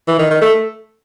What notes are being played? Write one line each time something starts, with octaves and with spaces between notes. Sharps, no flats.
E3
D#3
D#3
A3